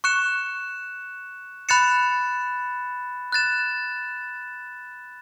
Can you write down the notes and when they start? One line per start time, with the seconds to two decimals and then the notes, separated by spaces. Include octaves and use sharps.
0.04 C#6 F#6 C#7 E7
1.69 B5 F#6 A6 C#7 E7
3.32 F#6 A6 E7